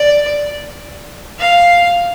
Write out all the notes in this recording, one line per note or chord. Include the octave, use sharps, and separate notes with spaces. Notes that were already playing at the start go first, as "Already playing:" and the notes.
Already playing: D5
F5